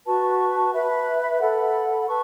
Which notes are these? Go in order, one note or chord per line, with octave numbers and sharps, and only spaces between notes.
F#4 B4 A5 C#6
B4 E5 B5
A4 F#5 B5
B4 A5 C#6